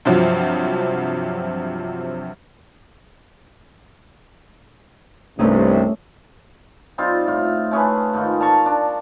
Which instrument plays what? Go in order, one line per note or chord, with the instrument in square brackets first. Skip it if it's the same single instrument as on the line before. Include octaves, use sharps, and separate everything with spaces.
[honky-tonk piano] G2 C3 F3 F#3
[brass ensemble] C2 G2 C3 [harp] A3 C#4 D#4
[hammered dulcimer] G3 C4 D#4 F4
A2 F4
A3 C#4 G#4 B4
G#2 D#3 D#4 F4
D5 A5 A#5 C#6
D4